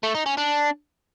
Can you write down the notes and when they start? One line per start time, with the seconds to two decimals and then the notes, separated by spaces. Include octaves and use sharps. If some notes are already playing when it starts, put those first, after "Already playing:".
0.03 A3
0.14 D#4
0.26 C#4
0.37 D4